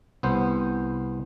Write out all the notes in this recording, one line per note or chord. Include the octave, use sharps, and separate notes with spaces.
C2 B3 C5